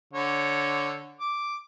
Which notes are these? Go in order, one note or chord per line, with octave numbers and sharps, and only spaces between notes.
D3 C#5
D6